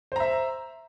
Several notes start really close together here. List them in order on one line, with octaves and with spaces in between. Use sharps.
C5 A#5 E5